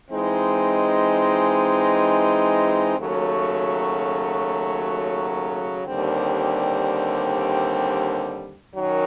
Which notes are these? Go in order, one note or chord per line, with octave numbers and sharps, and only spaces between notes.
E3 G#3 C4 D#4
D#2 C#3 F#3 A3
D#2 D3 G3 C4
F#2 D#3 F#3